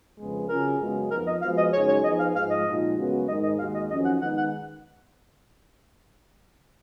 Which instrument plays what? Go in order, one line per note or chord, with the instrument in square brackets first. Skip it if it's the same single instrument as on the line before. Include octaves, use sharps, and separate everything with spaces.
[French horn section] F2 C#3 G#3 B3
[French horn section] C#3 F#3 C#4 F4 G#4 [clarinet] A#4
[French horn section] F#2 C#3 G#3 B3 F#4
[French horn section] F2 F3 B3 D#4 [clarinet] A#4
[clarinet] D#5
[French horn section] F3 G#3 B3 F#4 B4 [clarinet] F5
[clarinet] D#5
[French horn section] F#2 C#3 G#3 D#4 G#4 [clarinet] C#5
[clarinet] C#5
[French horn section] F3 B3 D#4 G#4 [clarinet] D#5
[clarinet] F5
[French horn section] G#2 F3 G#3 [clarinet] F5
[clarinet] D#5
[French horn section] A#2 F3 G#3 D#4 F#4
F#2 C#3 G#3 B3 F#4
[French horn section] G#2 D#3 G#3 D#4 A#4 [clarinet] D#5
[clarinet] D#5
[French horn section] D#2 D#3 G#3 D#4 F#4 [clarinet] F5
[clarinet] D#5
[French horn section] F2 D#3 F#3 C#4 [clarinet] D#5
[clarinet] F#5
[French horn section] D#3 G#3 B3 D#4 [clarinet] F#5
[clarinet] F#5